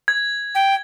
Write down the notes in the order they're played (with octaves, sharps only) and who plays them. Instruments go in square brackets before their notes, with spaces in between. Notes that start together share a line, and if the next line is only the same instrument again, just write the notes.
[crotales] G#6
[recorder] G5